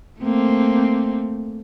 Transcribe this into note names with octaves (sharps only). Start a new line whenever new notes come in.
A3 A#3 C4